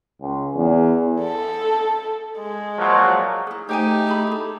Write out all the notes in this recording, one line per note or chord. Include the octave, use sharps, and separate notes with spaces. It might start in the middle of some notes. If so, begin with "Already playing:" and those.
C#2
E2
A4
G#3
A#2 F3 F#3
E4 G#4
A3 D#4 G4 C5 G5 G#5
E4 G#4 B5
E4 A4